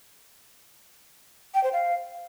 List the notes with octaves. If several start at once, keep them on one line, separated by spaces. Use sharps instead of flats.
G5
C5
F5